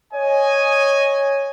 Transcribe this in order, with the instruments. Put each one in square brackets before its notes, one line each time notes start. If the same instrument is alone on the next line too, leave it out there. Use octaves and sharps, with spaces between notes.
[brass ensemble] C#5 D#5 G#5